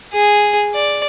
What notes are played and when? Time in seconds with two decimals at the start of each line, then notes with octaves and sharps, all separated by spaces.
0.13 G#4
0.75 D5